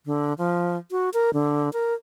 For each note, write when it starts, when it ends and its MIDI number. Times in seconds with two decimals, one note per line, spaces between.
0.06 0.33 50
0.38 0.77 53
0.91 1.10 66
1.14 1.30 70
1.34 1.72 50
1.73 1.94 70